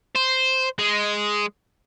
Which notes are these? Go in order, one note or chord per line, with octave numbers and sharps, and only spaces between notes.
C5
G#3